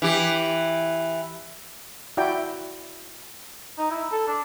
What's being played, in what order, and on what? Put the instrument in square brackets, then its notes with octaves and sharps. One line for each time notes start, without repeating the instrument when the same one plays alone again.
[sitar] E3 G4
[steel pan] E4 F#4 D5 G5
[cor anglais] D#4
E4
A4
D4